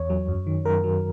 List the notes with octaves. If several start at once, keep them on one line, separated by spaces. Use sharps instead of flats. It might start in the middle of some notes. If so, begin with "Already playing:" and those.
Already playing: E2 C#5
F#3
F#2
D#3
F#2 A#4
F#3